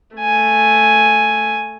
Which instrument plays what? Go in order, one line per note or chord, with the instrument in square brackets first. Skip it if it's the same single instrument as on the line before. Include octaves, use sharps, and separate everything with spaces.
[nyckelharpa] A3 G#5